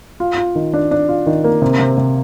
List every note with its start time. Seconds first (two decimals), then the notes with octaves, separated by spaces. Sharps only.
0.20 F4
0.38 F4
0.55 D#3
0.74 D4
0.91 D4
1.09 F4
1.26 D#3
1.44 A#3
1.62 C3
1.79 C3
1.97 C3